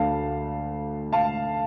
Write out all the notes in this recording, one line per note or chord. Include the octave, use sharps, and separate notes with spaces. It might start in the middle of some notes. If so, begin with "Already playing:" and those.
Already playing: D2 D3 F5 A5
F5 A5